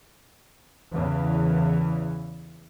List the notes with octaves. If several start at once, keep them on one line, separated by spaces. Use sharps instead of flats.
E2 C#3 E3